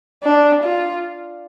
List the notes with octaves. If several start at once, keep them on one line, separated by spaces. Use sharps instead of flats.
D4
F4